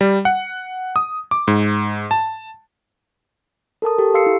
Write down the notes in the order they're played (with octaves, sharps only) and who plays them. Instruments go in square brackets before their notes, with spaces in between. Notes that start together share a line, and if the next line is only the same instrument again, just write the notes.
[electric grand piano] G3
F#5
D#6
D6
G#2
A5
[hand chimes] A4 A#4 A5 D#6
G4 A4
G4 F5 C6 E6 C7 C#7
E4